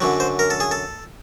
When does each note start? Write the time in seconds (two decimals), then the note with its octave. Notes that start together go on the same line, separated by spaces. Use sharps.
0.01 F#2 D3 F#3
0.20 C5
0.39 A#4
0.50 A4
0.60 G#4
0.71 A4